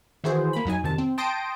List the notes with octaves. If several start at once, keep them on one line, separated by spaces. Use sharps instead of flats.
D#3 E3 E4 F#4 G#4 C5
A#3 B5
F2 F#3 D#4 G#5
F2 C3 D#3 A5
C4
G5 A5 C6 D#6 A#6 D7